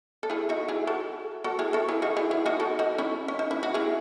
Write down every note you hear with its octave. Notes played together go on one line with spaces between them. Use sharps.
A4
E4 G#4
D#4 F#4
E4 G#4
F#4 A4
F#4 A4
E4 G#4
F#4 A4
E4 G#4
D#4 F#4
E4 G#4
E4 G#4
D#4 F#4
F#4 A4
D#4 F#4
C#4 E4
C#4
D#4
E4
F#4
E4 G#4